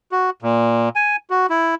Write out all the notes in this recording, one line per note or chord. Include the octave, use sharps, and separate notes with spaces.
F#4
A#2
G#5
F#4
E4